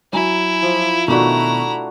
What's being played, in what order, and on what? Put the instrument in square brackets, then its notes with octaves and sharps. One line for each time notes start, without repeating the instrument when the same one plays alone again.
[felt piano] F#3 G#5 [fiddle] E4 [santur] A#5
[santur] F3
[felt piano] B2 D#3 [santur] A3 D4 F#4 [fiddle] E4 A#5